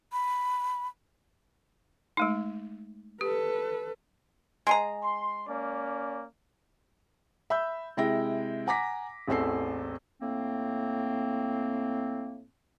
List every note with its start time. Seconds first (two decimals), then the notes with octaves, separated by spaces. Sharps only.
0.12 B5
2.17 G#3 A3 D#4
3.21 G4 A4 B4
4.67 G#3 G#4 A#5
5.03 C6
5.47 A#3 C#4 D5
7.50 E5 B5 E6 G6
7.97 C3 G#3 E4 E5 G5 A#6
8.67 F#5 G#5 A#5 D6 A#6 B6
9.28 A1 E2 C4 A4 C7
10.21 A2 A#3 C4